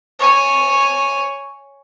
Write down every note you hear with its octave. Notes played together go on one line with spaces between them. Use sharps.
C#5 G#5